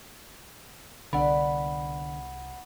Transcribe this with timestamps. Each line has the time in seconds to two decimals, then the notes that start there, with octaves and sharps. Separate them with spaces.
1.13 C2 D3 B3 D4 D5 F#5 B5